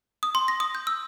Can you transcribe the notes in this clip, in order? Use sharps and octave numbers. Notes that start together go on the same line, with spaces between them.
D#6
C6
A#6
D#6
G6
E6